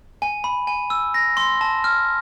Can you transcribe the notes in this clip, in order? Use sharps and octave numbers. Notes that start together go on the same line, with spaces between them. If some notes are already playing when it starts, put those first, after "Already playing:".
G#5
B5
G#5
E6
A#6
C6
A5
F6